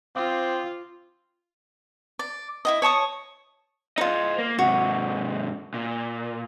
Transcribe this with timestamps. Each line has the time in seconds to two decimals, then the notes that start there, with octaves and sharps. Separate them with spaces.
0.16 C4 F4 F5 D6 D#6
2.19 D5
2.65 E4 F4 D#5
2.82 C#5 A5 C#6 D#6
3.98 D#4 F4 C5 D#5
4.38 A#3
4.59 G#2 C3 F#4
5.74 A#2